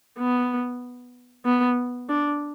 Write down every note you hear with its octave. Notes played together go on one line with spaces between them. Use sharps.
B3
B3
D4